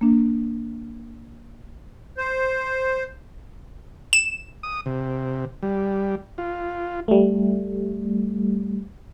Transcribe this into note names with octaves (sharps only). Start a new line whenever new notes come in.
A#3 D4
C5
E7
D#6
C3
G3
F4
G3 A3